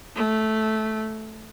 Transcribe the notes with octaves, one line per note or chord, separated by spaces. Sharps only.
A3